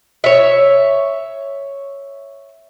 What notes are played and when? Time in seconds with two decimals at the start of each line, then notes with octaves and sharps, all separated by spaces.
0.24 C#5 E5